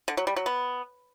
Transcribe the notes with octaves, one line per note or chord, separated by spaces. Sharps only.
D3
F#3
G3
F#3
B3